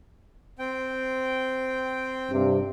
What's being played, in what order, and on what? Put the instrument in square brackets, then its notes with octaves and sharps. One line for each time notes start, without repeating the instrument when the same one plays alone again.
[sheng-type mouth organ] C4 G5
[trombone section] G2 C3